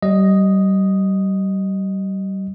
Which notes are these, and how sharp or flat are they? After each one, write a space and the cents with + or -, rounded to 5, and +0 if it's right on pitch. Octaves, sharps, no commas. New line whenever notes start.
G3 -30 D#5 +0